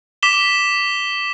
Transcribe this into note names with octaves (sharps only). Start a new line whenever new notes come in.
D6 B6 E7 G7